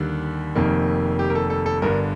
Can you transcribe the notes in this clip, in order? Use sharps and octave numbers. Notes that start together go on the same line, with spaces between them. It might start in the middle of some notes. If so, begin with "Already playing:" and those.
Already playing: D#2 D3 G3
F1 F2 D#3 A#3
G4
A#4
A4
A4
A4
G1 G2 D3 A#4